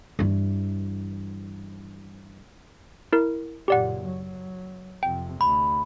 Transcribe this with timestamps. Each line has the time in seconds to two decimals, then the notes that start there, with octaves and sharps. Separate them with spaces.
0.19 G2 E3
3.13 E4 A#4
3.68 F#1 A#2 G4 D5 F#5
4.06 F#3
5.03 F2 C3 G5
5.41 D2 B5